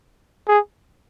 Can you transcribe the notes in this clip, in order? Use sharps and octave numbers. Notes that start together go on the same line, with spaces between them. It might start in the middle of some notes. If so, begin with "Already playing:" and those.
G#4